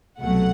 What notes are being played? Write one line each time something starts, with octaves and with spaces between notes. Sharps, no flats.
C2 B2 F#3 A3 F#5